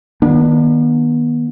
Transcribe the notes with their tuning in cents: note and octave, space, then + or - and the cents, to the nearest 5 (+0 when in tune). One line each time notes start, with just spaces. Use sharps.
D#3 +0 B3 -40 D4 +25